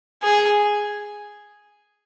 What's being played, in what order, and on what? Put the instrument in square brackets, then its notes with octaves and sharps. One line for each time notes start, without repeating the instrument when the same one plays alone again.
[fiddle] G#4